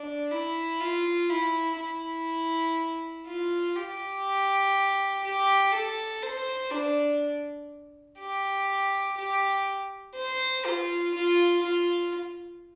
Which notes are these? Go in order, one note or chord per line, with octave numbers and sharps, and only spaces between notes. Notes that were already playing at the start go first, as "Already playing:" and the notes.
Already playing: D4
E4
F4
E4
E4
F4
G4
G4
A4
C5
D4
G4
G4
C5
F4
F4
F4